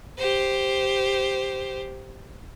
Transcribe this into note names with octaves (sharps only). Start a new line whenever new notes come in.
G4 C5